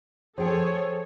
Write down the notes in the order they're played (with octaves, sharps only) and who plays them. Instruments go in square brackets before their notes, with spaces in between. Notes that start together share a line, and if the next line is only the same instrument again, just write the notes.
[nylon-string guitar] F3 G5 [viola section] G#4 A4 C#5